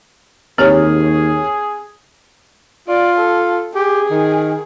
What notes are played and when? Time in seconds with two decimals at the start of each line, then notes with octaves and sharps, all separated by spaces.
0.58 D#2 C4 G4 G#4 C#5 G#5 F6
2.88 F4 D5
3.17 A4
3.75 G4 G#4
4.10 D#3